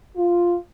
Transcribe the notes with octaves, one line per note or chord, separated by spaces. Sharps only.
F4